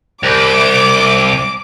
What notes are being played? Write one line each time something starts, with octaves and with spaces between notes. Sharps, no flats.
C2 D6